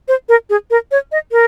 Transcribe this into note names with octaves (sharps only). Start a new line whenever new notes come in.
C5
A#4
G#4
A#4
C#5
D#5
A#4